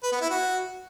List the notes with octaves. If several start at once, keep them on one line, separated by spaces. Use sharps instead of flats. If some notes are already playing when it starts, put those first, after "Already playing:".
B4
B3
E4
F#4